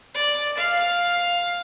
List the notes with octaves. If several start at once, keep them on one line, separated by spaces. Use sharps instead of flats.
D5
F5